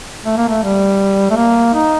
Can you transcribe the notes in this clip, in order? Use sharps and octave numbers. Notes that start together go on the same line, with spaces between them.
A3
A#3
A3
G3
A3
A#3
D#4